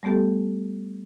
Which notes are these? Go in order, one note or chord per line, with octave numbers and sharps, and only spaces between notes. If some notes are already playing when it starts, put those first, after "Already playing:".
G3 A3 B3 G4 A4